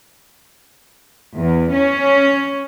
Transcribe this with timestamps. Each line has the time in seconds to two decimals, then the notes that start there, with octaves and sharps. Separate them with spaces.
1.35 E2
1.72 C#4